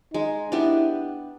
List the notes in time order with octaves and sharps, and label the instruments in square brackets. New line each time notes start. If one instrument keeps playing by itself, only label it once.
[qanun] G#3 [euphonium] D#4
[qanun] B3 D4 G4 [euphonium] E4